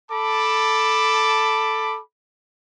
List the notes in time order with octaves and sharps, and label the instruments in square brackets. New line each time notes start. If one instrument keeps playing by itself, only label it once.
[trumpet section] A4 A5 B5 D6